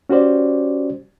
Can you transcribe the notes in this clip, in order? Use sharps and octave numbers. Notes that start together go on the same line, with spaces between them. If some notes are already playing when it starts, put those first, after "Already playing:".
C#4 F#4 G4 C5 D5